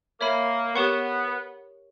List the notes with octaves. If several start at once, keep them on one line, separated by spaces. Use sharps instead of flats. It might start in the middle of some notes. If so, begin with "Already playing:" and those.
A#3 C#5 E5 B5
B3 G4 A#4 C#5 F#5 C#6